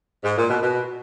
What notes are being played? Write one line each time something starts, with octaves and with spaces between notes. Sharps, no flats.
G#2
A#2
B2
B2